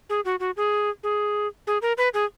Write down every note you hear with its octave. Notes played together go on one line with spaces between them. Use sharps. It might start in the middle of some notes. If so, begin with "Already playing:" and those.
G#4
F#4
F#4
G#4
G#4
G#4
A#4
B4
G#4